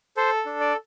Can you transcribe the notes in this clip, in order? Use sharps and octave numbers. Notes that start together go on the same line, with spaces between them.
A4 C5
D4
D5